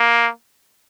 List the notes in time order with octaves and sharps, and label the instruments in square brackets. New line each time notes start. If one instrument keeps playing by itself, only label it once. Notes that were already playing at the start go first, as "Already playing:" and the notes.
Already playing: [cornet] A#3